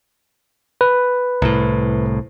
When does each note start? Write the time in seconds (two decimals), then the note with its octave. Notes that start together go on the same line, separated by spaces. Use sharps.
0.81 B4
1.42 C2 A2